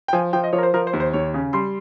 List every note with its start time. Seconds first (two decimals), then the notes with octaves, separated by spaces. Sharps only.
0.08 G5
0.13 F3 G#5
0.33 F3 G5
0.44 D#5
0.53 F3 C#5
0.58 A#4
0.63 C5
0.74 F3 A#4
0.87 C5
0.93 D#2
1.00 C5
1.13 D#2 C#5
1.34 C#3
1.53 G3 C6